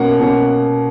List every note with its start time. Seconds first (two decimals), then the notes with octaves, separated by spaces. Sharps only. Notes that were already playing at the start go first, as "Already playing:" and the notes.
Already playing: B2 A#3 C#4 F#5
0.20 B2 A#3 C#4